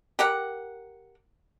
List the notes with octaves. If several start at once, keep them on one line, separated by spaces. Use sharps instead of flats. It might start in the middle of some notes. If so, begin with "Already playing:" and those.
G4 A#4 F#5